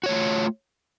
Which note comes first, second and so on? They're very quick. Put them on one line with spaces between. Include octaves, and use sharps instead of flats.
F#4 C#5 A3 F4